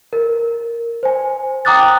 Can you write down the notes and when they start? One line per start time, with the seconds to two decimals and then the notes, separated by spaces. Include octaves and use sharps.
0.13 A#4
1.03 C5 G#5
1.65 G5 A#5 D6 D#6 F#6 A6